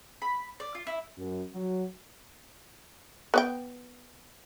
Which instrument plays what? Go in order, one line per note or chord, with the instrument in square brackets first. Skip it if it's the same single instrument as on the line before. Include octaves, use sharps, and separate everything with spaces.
[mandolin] B5
D5
F4
E4
[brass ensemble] F#2
F#3
[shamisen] B3 D5 G5